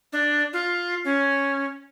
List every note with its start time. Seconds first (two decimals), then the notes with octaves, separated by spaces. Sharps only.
0.13 D4
0.53 F4
1.05 C#4